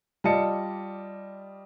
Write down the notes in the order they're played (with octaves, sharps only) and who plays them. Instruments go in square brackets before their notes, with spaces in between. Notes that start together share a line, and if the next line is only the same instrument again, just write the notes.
[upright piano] G3 F4 D5 D#5 A5 C#7